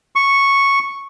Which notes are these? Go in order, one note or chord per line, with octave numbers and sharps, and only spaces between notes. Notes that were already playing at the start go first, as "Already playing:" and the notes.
C#6